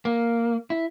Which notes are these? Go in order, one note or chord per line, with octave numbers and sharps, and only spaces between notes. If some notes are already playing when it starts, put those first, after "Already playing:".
A#3
E4